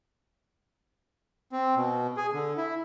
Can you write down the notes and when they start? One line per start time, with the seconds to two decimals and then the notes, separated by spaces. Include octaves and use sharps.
1.52 C4
1.77 B2
2.17 G#4
2.33 D3
2.57 E4